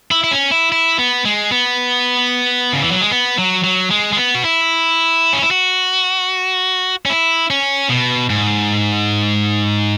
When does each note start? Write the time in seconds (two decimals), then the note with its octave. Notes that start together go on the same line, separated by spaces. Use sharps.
0.11 E4
0.24 E4
0.31 C#4
0.51 E4
0.72 E4
0.98 B3
1.25 G#3
1.52 B3
2.73 C#3
2.82 E3
2.91 F#3
3.01 G#3
3.11 B3
3.38 F#3
3.64 F#3
3.91 G#3
4.13 G#3
4.17 B3
4.35 F#4
4.44 E4
5.33 C#4
5.42 E4
5.51 F#4
7.06 C#4
7.10 E4
7.51 C#4
7.89 B2
8.30 G#2